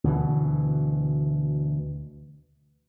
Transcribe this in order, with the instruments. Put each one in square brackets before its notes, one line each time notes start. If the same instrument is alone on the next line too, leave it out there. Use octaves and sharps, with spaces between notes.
[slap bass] D2 B2 E3